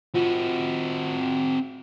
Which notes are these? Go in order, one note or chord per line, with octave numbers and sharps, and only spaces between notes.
C4 F4 F#4